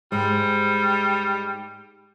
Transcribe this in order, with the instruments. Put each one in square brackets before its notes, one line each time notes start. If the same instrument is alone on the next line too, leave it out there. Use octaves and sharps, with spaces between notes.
[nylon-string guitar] G#2 G#3 [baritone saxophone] G3